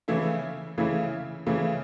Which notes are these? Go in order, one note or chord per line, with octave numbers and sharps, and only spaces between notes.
C#3 E3 A3 E4
C#3 E3 A3 E4
C#3 E3 A3 E4